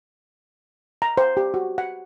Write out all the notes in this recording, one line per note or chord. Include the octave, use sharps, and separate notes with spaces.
A#5
C5
G4
F#4
F#5